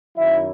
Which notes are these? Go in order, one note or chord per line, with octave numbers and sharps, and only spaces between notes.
F#2 D#3 F#3 E4 E5